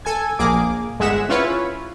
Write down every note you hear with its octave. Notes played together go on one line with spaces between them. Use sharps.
A4 G#5 G#6
A#1 A#3 G#4 D6
G1 G#3 G#4 E5 F#5 E7
C#4 E4 F4 B4 C#5